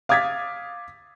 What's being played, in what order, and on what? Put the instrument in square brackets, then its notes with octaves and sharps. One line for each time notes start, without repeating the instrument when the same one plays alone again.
[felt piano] F5 D6 D#6 G#6 A6 B6